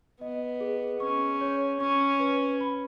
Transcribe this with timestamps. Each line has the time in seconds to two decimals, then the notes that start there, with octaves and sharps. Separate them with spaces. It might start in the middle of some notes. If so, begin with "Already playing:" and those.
0.21 B3 D#5
0.61 G#4
1.00 C#4 C#6
1.41 C#5
1.80 C#4 C#6
2.20 B4
2.61 B5